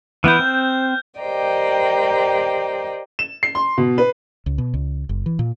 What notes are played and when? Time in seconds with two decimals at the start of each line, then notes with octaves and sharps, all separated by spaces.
0.24 E3 B3 E4 F6 G6
0.39 C4
1.19 G4 A#4 C5 D5 D#5 G5
3.19 E7
3.43 C7
3.55 C6
3.78 B2
3.98 B4
4.46 C#2
4.58 B2
4.74 C#2
5.09 F#1
5.26 E3
5.39 A#2